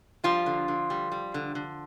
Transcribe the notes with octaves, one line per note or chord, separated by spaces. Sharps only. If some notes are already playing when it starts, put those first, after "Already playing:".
F3 G3 F4
D3
D3
G3
G3
D3
D3